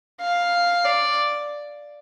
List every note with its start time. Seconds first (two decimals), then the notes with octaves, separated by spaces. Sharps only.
0.21 F5
0.85 D5